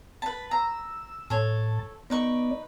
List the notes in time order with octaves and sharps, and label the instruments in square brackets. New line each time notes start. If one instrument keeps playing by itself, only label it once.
[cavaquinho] B4 A5 [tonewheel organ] B5
[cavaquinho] A#5 [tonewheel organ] E6
[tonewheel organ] A2 A5 [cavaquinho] A4 C#5
[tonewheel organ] B3 D5 [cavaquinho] D#4 B4 C#6